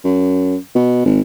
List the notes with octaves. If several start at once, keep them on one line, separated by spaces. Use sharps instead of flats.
F#2
B2
G#1